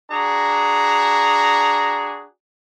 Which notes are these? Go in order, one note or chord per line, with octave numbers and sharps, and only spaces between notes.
D4 F#4 G#4 A#5